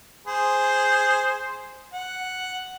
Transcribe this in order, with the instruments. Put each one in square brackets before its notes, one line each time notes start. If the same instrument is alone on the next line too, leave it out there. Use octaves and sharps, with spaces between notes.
[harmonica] G#4 C5
F#5